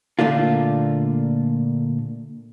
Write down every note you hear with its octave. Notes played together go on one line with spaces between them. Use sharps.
A#2 D3 A3 A#3 F4